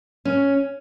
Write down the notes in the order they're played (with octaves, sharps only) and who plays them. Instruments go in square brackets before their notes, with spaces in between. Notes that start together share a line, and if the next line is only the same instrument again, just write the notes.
[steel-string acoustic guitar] C#4